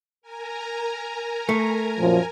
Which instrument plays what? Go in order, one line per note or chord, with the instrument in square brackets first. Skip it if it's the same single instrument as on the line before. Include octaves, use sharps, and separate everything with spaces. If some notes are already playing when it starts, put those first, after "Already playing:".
[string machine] A#4 G#5 A#5
[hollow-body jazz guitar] A3
[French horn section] F#2 A#2 F3